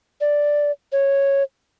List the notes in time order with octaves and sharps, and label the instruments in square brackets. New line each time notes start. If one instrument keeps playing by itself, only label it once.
[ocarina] D5
C#5